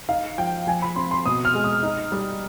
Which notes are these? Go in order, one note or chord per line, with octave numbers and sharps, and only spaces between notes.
D#4 F5
F3 G5
F3 G#5
B5
C4 C6
C6
B2 D#6
F6
G#3
D#6
D#4
G3